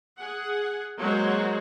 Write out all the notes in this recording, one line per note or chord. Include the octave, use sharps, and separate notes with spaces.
G#4 F#5
F#3 G#3 A#3 F#4 C5 C#5